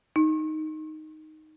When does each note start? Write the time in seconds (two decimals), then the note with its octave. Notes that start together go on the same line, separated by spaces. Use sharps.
0.16 D#4